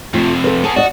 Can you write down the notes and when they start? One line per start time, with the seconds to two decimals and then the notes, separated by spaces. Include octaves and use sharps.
0.14 F2 C3 A3 F4
0.44 A4 B4
0.64 B3 G#4 A5
0.76 F#4 D5 D#5